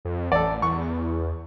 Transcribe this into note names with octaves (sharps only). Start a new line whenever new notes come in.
F2
A1 A4 D5
E2 C#6